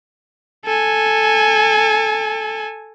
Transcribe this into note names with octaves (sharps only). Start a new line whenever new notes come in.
A4 G#5